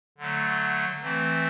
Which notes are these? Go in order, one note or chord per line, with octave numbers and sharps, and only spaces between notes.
D3 F#3 A3
E3 A3 C4